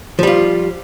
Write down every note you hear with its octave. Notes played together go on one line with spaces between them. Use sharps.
F3 G3 F4